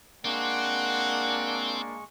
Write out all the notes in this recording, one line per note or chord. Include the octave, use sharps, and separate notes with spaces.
G#3 A#3 C4 D4 F#5 C#6